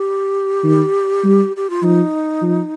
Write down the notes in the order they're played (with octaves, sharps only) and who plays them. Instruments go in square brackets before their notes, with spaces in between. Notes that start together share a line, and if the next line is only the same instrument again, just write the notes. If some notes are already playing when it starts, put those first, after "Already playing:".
Already playing: [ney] G4
[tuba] D#3
G3
[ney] G4
F4
[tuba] F3 [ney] D#4
[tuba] F3